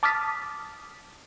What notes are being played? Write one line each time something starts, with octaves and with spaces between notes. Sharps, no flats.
A5 D6 D#6 F6 A6 B6